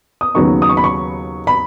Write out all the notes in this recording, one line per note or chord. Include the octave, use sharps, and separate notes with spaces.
D#6
D#2 C#3 F#3 B3 D#4 C#6
D#6
C#6
B5
C#6
B5